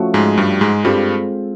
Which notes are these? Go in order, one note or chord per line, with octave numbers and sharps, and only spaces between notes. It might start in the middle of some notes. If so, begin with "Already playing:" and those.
Already playing: F3 A3 C#4 F#4
G#2 G#3
G2 G3
G#2 G#3
G2 G3 G#3 C4 F4 A4